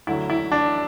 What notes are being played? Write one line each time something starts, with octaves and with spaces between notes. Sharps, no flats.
D2 D3 F#3 E4
E4
D4